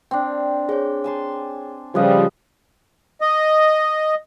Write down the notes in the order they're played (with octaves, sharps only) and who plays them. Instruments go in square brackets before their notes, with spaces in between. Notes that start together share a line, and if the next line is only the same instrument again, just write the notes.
[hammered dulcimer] C4 D4 [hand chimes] G5
[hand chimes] G#4 C#5 [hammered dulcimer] G5
[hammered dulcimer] G#5 A5 C6
[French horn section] C#3 F3 G3 [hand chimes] G4 F5 [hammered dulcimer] B4 D#5
[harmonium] D#5